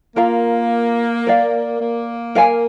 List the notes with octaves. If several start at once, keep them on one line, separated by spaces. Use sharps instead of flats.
A#3 F4 A#4 F5 A#5
A#4 D5 F5
A#3
A#4 F5 G#5